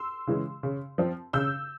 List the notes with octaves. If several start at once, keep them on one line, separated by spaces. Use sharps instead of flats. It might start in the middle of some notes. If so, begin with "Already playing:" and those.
Already playing: C6 E6
C#3 E3 G#3
C#3
F3 C4
C#3 E6 G6